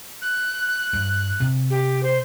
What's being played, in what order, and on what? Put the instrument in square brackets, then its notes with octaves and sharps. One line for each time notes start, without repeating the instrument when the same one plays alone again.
[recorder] F#6
[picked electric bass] G2
C3
[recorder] G4
C5